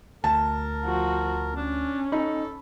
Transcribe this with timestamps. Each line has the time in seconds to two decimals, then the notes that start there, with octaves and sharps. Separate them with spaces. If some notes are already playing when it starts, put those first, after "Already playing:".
0.24 D2 A#4 A5
0.85 F3 F#4
1.57 C#4 D4
2.12 D#4 A4 B5